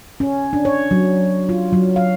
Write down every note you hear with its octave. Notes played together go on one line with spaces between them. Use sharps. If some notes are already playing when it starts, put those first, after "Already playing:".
C#4
D4
C#5
F#3
F4
F#3
F5